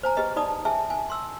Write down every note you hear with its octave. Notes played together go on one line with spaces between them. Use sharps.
C5 G#5 A#5
G4 G#4 B4 D#5
D#4 D5 A5 B5 D#6
G#4 E5 G#5 A5
G#5
C6 E6